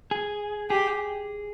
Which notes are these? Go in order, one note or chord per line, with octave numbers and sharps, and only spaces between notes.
G#4
G4 G#4